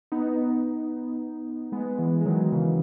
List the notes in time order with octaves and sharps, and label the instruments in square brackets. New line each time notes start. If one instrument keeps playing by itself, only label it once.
[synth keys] B3 D#4
G#3 B3
E3 G#3
G#3
D#3 F#3
C#3 E3